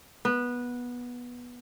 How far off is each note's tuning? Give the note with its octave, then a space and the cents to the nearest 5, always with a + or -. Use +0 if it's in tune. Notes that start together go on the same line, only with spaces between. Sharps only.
B3 -15